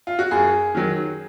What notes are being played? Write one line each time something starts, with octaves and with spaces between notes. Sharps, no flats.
F4
F#4
F#2 G#4
D#3 F#3